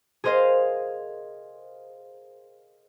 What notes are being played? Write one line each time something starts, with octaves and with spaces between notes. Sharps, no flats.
G#4 A#4 C5 D#5 F5